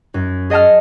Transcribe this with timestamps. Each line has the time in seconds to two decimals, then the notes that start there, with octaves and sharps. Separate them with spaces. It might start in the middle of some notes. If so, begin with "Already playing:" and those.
0.14 F#2
0.50 G#4 D#5 F#5 A5 F6